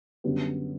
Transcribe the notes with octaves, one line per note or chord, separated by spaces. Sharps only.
F#2 D3 G3 B3